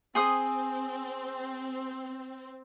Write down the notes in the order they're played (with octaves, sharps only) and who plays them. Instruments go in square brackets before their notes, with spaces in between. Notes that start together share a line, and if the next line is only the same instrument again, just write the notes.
[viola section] C4 [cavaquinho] G#4 C5 D#6